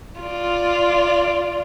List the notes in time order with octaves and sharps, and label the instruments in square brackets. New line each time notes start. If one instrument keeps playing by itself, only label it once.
[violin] F4 D5